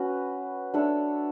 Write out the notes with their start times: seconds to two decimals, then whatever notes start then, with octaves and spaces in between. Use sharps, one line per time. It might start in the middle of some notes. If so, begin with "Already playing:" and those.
Already playing: C#4 F#4 B4
0.74 D4 A4 C#5 E5